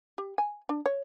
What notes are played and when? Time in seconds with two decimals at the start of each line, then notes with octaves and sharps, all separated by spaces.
0.18 G4
0.38 G#5
0.69 D4
0.86 C#5